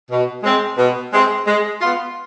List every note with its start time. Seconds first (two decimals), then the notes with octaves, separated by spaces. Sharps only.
0.10 B2
0.43 G#3 C4
0.77 B2
1.12 G#3 C4
1.46 G#3
1.80 B3 F4